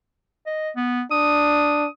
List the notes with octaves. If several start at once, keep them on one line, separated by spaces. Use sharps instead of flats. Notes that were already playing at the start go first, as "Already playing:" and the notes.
D#5
B3
D4 D#6